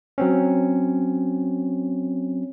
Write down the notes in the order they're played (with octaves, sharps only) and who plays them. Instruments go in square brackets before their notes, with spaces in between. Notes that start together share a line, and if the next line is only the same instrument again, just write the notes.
[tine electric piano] F#3 C4 C#4